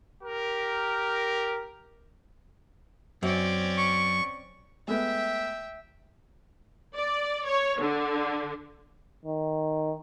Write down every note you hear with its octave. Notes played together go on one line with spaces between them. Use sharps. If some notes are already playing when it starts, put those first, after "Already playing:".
G4 A#4
F#2 C4 C#4 D5
C#6
G#3 A3 B3 E5 G5
D5
C#5
D3
D#3